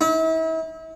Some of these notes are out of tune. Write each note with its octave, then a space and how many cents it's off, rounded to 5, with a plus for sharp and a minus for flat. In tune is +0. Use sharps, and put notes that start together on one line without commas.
E4 -40